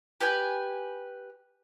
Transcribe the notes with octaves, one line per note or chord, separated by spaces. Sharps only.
G4 B4 G5 G#5